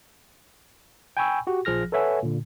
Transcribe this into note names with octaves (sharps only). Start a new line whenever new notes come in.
G5 G#5 B5 C#6 E6
F#4 G4
A#1 F3 G#4 F6 A#6
A4 B4 C#5 E5 F#5 G#5
A#2 D3